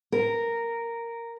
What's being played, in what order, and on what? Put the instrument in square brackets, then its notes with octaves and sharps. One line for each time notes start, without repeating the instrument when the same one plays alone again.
[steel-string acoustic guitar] A#4